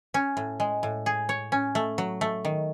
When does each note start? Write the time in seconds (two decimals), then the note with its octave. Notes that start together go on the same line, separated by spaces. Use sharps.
0.14 C#4
0.37 A2
0.60 G#3
0.83 A2
1.06 G#4
1.29 C#5
1.52 C#4
1.75 A3
1.98 F#3
2.21 A3
2.45 D#3